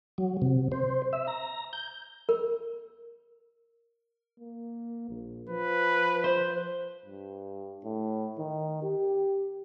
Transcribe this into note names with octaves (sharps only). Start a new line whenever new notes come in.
F#3
C3
C5
E5
A#5
G6
A#4
A#3
A#1
F3 B4
C5
G2
A2
D#3
G4